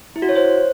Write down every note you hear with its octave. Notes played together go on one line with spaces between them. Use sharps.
E4
F#4
C#5
C5